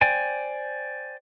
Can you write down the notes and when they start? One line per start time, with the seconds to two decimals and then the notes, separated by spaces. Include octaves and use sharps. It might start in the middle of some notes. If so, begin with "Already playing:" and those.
0.01 C5 D5 G5 G#5